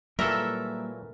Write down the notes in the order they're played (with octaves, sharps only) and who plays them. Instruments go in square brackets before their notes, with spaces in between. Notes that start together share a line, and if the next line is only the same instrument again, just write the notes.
[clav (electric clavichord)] A#2 E3 F#3 [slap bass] G3 A#3 [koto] A4 A#4 [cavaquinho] E5